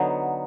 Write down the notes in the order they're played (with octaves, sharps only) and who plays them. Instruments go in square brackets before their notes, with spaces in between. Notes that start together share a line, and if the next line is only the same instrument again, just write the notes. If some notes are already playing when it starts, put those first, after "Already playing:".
Already playing: [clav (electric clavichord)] D3 F#3 B3 D#4